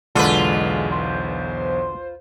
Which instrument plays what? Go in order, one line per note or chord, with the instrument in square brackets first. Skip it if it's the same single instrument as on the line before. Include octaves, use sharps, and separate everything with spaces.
[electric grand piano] B1 E2 [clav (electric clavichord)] D3 [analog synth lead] G#3 [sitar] F4 B4
[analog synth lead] C5